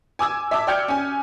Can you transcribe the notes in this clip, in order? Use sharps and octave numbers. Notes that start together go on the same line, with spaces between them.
G#5 D6 E6 G#6
E5 A5 D6 E6
D5 G5 F6 G6 G#6 C#7
C#4 G#5